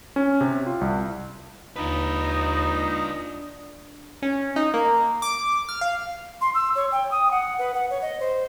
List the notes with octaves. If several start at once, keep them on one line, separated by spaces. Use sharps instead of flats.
C#4
C3
F4
C2
D#2 D4 D#4 F4 B4
C#4
D#4
A#3
D6
F6
F5
C6
E6
C#5
G5
D#6
F#5
B4
F#5
C#5
D#5
C5